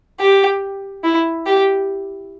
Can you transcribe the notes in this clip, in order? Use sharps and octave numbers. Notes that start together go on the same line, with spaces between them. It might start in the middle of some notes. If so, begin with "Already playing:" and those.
G4
E4
G4